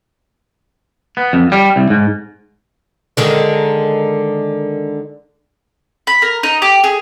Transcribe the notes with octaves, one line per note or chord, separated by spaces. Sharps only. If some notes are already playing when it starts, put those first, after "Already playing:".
B3
F2
G3
C2
G#2
D3 D#3 G#3
B5
A#4
D#4
G4
G#4